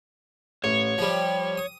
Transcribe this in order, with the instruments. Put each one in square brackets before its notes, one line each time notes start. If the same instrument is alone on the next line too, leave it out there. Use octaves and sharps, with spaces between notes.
[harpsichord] A1 [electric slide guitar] C#5
[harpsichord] F3 G3
D#6